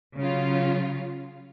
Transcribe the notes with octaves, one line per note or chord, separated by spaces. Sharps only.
C#3 F#3 F4